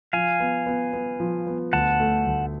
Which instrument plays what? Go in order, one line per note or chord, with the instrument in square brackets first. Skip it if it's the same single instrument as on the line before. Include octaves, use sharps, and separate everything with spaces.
[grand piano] F3 [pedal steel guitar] F5 G#5
[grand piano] B3
B3
B3
F3
B3
[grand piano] D2 [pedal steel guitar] F#5 A5
[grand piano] A3
D2